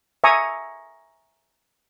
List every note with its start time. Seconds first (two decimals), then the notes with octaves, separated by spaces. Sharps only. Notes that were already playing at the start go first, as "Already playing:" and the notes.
0.24 E5 G#5 A#5 C#6 D#6